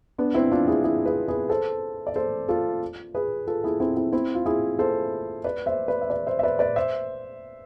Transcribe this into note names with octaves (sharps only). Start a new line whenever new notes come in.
B3 D4
C4 E4
D4 F4
E4 G#4
E4 G#4
G#4 B4
G#4 B4
A4 C5
D5
A4 C5
F4 A4
G#4 B4
F4 A4
E4 G#4
C4 E4
C4 E4
C4 E4
F4
E4 G#4
A4 C5
B4 D5
C5 E5
B4 D5
E5
B4 D5
C5 E5
E5
B4 D5
B4 D5
C5 E5